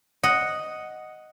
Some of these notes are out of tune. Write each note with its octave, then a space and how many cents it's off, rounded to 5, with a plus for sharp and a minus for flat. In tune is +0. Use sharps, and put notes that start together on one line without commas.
D#5 +0 F#5 +0